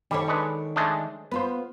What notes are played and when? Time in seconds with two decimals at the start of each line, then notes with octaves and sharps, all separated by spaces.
0.11 D#3 G3 A4 C#5
0.28 G#3 D4 B4
0.76 G#3 A3 D4
1.32 B3 F4 B4 C5